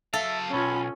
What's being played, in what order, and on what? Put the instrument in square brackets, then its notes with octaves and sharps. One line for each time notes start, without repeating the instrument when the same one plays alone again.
[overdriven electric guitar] F#3 F5 [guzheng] A4 [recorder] E5
[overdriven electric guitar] B1 [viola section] C#4 F4 [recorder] B5